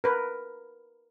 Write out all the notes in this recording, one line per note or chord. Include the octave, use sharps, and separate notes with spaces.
A#4 B4